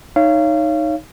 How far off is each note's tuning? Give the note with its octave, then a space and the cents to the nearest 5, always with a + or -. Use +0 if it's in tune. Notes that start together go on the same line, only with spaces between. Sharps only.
D#4 +0 C#5 +5 F5 -30